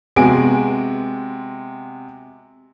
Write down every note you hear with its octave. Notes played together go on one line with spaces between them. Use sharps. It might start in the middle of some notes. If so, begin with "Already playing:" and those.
C3 G#3 B3 F#4 G#5 D7